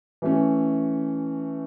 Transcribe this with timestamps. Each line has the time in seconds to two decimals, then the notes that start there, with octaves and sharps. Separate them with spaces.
0.22 E3 A3 C#4